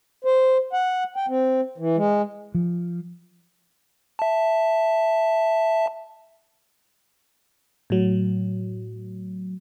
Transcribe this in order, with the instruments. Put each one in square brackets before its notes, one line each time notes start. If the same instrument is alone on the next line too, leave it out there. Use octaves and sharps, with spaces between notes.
[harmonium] C5
F#5
G5
C4
E3
G#3
[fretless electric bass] F3
[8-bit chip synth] E5 A5
[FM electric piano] A2 F#3